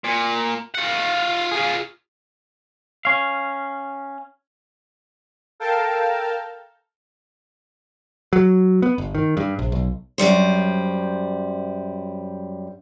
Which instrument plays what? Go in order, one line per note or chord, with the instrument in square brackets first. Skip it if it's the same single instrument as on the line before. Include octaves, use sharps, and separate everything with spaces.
[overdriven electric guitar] A#2
F4 F#5
F4 G#4
[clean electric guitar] C#4 F5
[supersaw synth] A4 A#4 F5 G5 A5
[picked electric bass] F#3
B3
G1
D#3
G2
A#1
B1
[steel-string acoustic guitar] F#2 A#2 G3 C5